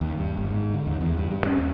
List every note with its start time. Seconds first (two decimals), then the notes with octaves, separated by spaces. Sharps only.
0.01 D#2
0.18 G2
0.37 G1
0.50 G#2
0.74 D3
0.87 D#2
1.01 E2
1.17 G2
1.31 G2
1.46 C#4
1.58 D#2